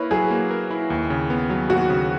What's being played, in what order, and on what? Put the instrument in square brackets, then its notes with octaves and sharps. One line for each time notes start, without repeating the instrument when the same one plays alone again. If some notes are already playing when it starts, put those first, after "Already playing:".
Already playing: [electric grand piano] A#3 E4 A#4 [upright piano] B4 C#5
[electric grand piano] F#3 [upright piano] G#4
[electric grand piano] A#3
A#4
E4
D#2
C#3
B3
F#3
[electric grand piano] D#2 [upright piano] F#4
[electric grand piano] C#3